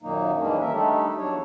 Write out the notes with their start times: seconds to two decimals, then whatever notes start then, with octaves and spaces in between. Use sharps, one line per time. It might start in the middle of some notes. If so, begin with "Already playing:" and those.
0.03 F#2 A#2 D#3 F#3 A#3 D#4
0.39 E3 G3 G#3 A#3 C#4 D4
0.61 D#3 A#4 E5
0.73 G3 A3 D4 D#4 G4 A4
1.19 E2 F#3 D4 C#5